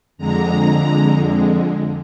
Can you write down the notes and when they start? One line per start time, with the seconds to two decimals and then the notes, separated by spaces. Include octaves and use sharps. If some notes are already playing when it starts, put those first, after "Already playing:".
0.18 F2 D3 G#3 A#5